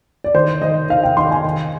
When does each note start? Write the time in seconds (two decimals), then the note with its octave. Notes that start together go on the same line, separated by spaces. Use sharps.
0.24 D5
0.34 D#3 C5
0.62 D#3 D#5
0.89 D#3 F5
1.03 G5
1.17 D#3 C6
1.31 G#5
1.44 D#3